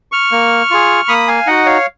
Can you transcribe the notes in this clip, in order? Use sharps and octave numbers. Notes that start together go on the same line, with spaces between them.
C#6 F6
A#3
F4 G#4
A#3 B5 D#6
F5 G#5
D#4 F#4 D#5 F#5
C#5 F5